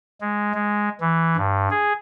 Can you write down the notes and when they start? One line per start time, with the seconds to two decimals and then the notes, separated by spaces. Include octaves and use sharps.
0.21 G#3
0.54 G#3
1.00 E3
1.37 G2
1.71 G#4